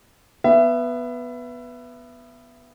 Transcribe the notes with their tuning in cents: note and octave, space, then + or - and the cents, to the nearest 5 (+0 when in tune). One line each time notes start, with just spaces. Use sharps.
B3 +0 E5 +25